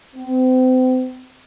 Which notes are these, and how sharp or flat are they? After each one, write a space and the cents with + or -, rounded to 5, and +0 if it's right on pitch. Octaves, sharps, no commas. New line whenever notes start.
C4 -35